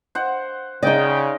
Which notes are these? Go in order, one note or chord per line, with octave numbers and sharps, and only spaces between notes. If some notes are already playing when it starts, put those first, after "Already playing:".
C5 F#5
C#3 D#4 D5 D#5 G5